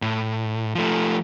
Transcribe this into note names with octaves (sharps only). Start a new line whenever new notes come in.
A2
F3 A3